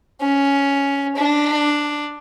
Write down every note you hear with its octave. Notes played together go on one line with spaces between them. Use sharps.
C#4
D4